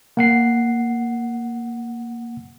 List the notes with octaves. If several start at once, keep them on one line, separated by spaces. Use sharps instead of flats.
A#3 F#5 C7